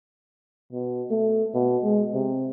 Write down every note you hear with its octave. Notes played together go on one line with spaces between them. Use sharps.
B2
A3
B2
G#3
C3